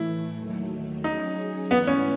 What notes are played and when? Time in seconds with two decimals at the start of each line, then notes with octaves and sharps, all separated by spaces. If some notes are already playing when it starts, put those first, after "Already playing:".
Already playing: A2 E3 A3 E4
0.37 D#2 D#3 F#3 A3
1.04 F#3 C#4 D#4 G#4
1.71 G#2 E3 A3 B3 E4 B4
1.87 C#4